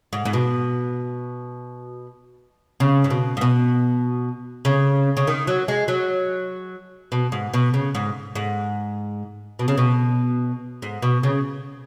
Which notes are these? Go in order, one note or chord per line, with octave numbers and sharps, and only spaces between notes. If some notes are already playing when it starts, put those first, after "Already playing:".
G#2
G#2
B2
C#3
G#2
B2
G#2
B2
C#3
C#3
D#3
F#3
G#3
F#3
B2
G#2
B2
C#3
G#2
G#2
B2
C#3
B2
G#2
B2
C#3